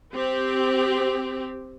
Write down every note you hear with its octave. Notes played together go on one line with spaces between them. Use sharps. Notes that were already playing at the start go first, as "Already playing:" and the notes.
C4 G4